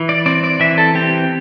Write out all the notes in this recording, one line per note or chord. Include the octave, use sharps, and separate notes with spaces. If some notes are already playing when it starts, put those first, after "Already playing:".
Already playing: E3
D5
C4 D5
D5
E3 E5
A4
C4 G4